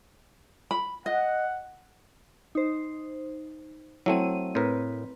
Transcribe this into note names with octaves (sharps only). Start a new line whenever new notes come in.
B5
D#5 F#5
D#4 C5
F#3 A3 C4 E4 D#7
A2 C4 A#4 B4